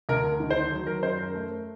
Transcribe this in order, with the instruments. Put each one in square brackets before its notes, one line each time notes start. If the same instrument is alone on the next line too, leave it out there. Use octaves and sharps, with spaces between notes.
[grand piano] D2 A#4
D#3
C5
F#3
A#4
F#2 C5
A#4
A3